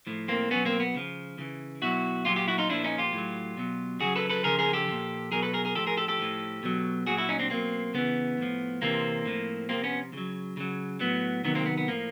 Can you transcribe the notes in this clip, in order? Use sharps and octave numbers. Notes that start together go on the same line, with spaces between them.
A2 F3
A#3 C4
B2 F#3 B3 C#4
A#3 C4
B3
C#3 F3
C#3 E3
B2 F#3 E4 F#4
A#2 F#3 F4 G4
F4 G4
E4 F#4
D#4 F4
A#2 F3 D4 E4
C#4 D#4
F4 G4
A2 F#3
B2 F#3
C#3 F#3 F#4 G#4
A4 B4
A4 B4
C#3 F3 G#4 A#4
G#4 A#4
G4 A4
A#2 F3
B2 F#3 G#4 A#4
A4 B4
G#4 A#4
G#4 A#4
A2 F3 G4 A4
G#4 A#4
G4 A4
G4 A4
A2 F3
B2 F#3
A#2 F#3 F#4 G#4
E4 F#4
C#4 D#4
C4 D4
B2 F#3 A#3 C4
C#3 E3 B3
A2 F3
C3 E3 A#3 C4
A2 F3
C3 F3 A#3 C4
B3 C#4
C#3 F#3
C#3 F#3
A2 F#3 B3
C3 D#3 F#3 B3
A#3 C4
B3
B3
A2 F3 A#3